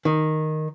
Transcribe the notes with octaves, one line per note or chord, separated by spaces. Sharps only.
D#3